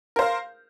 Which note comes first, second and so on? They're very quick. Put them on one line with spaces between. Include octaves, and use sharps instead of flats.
A#4 C5 F5